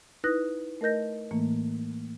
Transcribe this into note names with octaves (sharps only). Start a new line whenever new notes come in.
D#4 E4 B4 D#6 F#6 A#6
A3 A#4 D#5 G6 A#6
A2 E3 A3 A#3